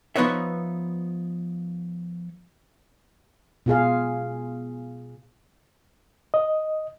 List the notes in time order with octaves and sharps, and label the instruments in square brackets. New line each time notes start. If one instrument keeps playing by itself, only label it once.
[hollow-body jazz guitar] F3 B3 D#4 B4 C#5 E5
[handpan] B2 F4 G#4 F5
[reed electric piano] D#5